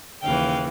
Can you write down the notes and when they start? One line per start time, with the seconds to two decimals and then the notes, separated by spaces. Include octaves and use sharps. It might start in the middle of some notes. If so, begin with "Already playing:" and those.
0.22 D#2 C#3 E3 F5 G5